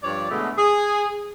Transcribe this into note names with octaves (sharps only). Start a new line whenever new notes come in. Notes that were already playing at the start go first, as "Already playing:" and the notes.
G2 F3 C#5 D5
B2 D3 E3 G#3 A3
G#4